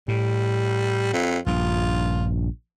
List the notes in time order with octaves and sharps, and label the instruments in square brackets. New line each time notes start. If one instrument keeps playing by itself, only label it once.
[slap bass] A2 [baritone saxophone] G3
[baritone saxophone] F2
[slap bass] A#1 G2 [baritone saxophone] F4